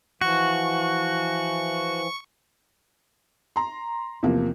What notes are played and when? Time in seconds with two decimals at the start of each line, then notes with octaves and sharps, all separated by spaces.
0.21 E3 F3 F#4 C#6
3.56 A#5 C6
4.23 E2 C3 F3 A#3